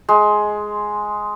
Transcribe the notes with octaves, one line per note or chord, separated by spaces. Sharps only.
G#3